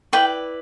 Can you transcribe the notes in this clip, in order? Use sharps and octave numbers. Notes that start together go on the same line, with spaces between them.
E4 B4 D5 G5